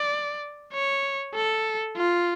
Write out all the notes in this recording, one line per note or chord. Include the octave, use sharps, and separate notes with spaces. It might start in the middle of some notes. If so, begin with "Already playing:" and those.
Already playing: D5
C#5
A4
F4